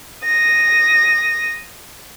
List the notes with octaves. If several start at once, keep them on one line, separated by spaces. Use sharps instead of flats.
D#6 A#6